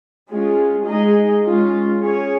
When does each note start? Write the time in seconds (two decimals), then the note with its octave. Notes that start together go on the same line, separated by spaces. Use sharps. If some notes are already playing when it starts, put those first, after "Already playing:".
0.31 G#3 C#4 F4 G#4
0.87 G#3 D#4 G#4 D#5
1.44 G#3 C#4 F4
1.99 C#4 G#4 C#5